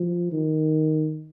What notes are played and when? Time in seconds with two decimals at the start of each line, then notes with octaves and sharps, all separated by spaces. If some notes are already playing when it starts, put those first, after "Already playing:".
Already playing: F3
0.32 D#3